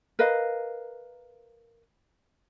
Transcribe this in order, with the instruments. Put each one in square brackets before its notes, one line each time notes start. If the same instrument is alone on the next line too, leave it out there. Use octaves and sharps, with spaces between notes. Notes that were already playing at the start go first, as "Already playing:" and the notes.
[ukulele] A#4 B4 D#5 F5